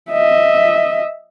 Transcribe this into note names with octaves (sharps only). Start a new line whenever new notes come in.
D#5 E5